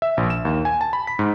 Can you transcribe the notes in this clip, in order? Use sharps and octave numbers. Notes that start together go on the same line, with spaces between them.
E5
A#1
E7
D#2
G#5
A5
B5
B6
G#2